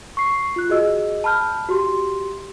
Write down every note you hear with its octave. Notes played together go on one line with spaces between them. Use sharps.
C#6 C7
F4 F#6
F#4 G#4 D#5 E6
A5 B5 F6 G6
F#4 G4 C6